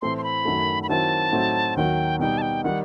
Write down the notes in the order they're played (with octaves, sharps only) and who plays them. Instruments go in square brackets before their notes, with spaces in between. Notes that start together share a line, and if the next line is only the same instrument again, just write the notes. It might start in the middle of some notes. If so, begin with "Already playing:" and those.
[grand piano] A2 E3 A3 C4 [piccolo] C6
[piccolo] C6
B5
[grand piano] F#2 D#3 F#3 A3
[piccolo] B5
[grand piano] D#3 F#3 C4 E4 [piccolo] A5
[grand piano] A2 F#3 A3 C4 D#4
[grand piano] D#2 D#3 F#3 [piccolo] G5
[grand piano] B2 G3 D#4 [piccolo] G5
[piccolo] A5
G5
[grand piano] D#3 G3 D#4 [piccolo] F#5